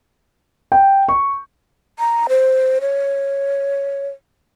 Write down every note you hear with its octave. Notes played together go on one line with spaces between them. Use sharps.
G5
C#6
A#5
C5
C#5